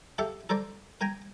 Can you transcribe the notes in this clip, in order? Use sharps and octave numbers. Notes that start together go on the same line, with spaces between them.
G4 A4 E5 F5
A4 A#4 C5 D5
A#4 G5 G#5 A#5